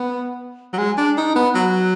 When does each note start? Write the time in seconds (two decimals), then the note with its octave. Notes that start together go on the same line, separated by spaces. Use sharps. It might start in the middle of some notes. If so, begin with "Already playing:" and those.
Already playing: B3
0.73 F#3
0.78 G#3
0.98 D4
1.17 D#4
1.36 B3
1.55 F#3